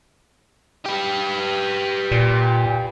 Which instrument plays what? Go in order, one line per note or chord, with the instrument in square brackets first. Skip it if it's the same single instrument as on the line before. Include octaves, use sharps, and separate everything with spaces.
[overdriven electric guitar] G4 B4
[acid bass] A#2